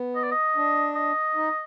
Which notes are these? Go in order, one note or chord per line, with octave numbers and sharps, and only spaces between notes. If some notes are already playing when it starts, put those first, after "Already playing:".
Already playing: B3
D#5
D5
D#5
D4
D#5
D#4